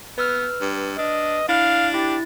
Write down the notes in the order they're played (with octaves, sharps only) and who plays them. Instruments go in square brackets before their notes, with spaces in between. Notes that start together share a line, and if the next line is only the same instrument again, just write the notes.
[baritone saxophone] B3 [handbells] B4 E6 F6
[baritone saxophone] G2
[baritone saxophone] D4 [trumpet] D#5
[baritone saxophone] D4 [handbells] E4 [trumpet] F5
[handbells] E4 A6 [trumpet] G4